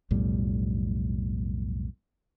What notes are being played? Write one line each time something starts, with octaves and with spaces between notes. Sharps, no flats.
B1 F2 A2 G3